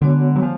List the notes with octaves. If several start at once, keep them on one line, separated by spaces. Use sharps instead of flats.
D3 G#3 B3 F#4 C#5
F#3
F3 G#3